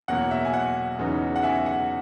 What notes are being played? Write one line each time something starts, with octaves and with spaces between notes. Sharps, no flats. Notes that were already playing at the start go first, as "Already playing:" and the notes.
E2 B2 F#3 A#3 F#5
E5
G#5
F#5
E2 C#3 F#3 B3 D#4
F#5
E5 G#5
F#5